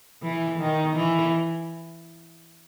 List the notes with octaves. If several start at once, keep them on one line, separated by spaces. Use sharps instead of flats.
E3
D#3
E3